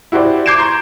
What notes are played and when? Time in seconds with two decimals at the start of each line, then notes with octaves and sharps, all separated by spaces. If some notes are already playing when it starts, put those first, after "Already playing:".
0.12 E4 F#4 G4 C5 D5
0.46 D6 G6 G#6 C7 D7 E7
0.58 A#5 C6 C#6